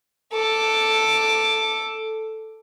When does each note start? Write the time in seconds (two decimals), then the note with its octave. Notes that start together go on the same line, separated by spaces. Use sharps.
0.33 A4 D6